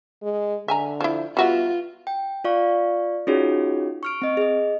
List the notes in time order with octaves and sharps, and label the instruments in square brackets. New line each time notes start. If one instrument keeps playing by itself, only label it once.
[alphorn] G#3
[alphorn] D3 [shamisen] E5 G#5 A#5
[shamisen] F3 E4
[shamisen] G3 F#4 E5 [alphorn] B3 [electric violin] F4
[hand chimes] G5
F4 D5 F5 C#6
C#4 D#4 F4 F#4 G#4 C#5
C#6 F6 D7
C4 D#5
G#4 D#5